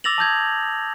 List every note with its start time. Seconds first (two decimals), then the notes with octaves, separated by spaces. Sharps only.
0.04 D6 E6 A6 A#6 F7 F#7
0.18 A5 D#6 G6 G#6